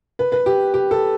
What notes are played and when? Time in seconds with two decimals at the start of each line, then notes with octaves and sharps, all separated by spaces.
0.19 B4
0.32 B4
0.46 G4
0.74 G4
0.91 A4